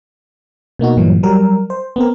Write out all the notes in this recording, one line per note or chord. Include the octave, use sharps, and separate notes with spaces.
B2 A#3 D#4 F#4
G2 A#2 E3 F#3
F#3 G3 A#4
C5
B3 C4 A#4